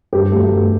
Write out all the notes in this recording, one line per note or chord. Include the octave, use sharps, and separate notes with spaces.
G2 G4
F#3 A3
G2